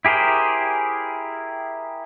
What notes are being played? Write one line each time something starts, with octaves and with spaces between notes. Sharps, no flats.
E4 G4 G#4 A#4 C5